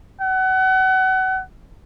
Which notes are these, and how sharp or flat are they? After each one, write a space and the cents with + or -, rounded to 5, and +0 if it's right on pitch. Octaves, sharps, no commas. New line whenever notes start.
F#5 +30